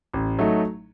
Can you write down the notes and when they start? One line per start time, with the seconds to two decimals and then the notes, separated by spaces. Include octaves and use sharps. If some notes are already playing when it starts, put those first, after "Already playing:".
0.14 A1
0.39 F#3 A3 D#4